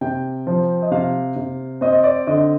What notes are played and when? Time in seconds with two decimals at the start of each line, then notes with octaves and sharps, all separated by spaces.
0.01 C3 G5
0.47 F3
0.82 D#5
0.91 C3 F5
1.36 C3
1.81 C4 D#5
1.93 D#5
2.04 D5
2.27 D3 D#5